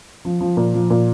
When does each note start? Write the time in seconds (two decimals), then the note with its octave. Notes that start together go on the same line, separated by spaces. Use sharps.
0.25 F3
0.40 F3
0.57 A#2
0.74 F3
0.90 A#2